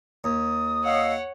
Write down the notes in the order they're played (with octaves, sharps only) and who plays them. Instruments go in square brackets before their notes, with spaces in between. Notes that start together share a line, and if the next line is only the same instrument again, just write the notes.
[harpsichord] D#2 [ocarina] D#6
[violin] C#5 F#5 [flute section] D#5 F5 E6